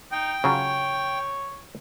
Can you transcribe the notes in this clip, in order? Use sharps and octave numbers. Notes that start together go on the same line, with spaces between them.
D#4 G5
C#3 F#3 F4 C#5